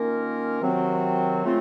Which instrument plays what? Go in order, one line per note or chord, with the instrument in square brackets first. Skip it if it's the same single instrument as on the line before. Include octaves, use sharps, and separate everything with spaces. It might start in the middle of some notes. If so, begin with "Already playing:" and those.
Already playing: [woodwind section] D#3 A#3 C#4 F4 A#4
C3 D#3 F#3 C4 F#4
C#3 A3 C4 F4